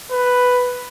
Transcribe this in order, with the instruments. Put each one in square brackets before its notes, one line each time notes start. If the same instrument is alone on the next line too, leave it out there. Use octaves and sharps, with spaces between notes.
[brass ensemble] B4